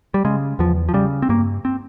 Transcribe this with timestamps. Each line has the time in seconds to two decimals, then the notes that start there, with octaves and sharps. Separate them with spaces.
0.14 G3
0.25 C#3 G#3
0.59 E2 F3
0.89 F3
0.94 C#3 G3
1.22 C4
1.29 G2 A#3
1.65 C4